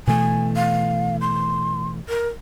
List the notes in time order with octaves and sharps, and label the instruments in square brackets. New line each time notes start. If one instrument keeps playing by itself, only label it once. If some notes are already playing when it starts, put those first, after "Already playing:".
[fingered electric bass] B2 E3 A3 [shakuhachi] G#5
[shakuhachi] F5
C6
A#4